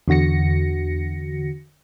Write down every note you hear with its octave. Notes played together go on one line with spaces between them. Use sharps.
E2 D3 F#4 A#6 C#7